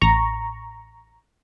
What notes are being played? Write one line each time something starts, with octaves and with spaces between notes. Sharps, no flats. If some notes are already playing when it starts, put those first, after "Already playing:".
A1 A#5 C#6